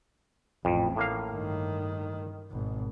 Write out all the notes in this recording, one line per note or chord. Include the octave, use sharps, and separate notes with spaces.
A1 F2
A2 A#3 F5
G2 D#3
G#1 B2